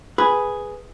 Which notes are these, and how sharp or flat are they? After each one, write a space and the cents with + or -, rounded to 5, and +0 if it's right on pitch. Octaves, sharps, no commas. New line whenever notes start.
G#4 +0 B4 +0 B5 +0